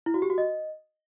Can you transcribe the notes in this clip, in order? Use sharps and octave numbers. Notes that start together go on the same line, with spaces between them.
E4
F#4
G4
F#4
D#5